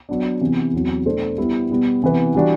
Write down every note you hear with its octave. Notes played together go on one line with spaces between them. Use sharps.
F#3 B3 D4
C3 E3 B3 E4
E2 C3 F#3
B2 A3 D4 A4 C5
G3 B3 E4
B2 G3 B3
C3 E3 B3 E4 B4
E3 G3 D4 F#4